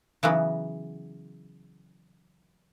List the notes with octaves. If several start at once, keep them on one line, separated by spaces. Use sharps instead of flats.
C#3 E3 F#3 B3